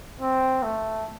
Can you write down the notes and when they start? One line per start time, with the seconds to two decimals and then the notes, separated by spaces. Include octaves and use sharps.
0.21 C4
0.63 A3